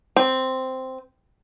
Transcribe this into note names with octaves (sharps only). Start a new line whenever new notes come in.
C4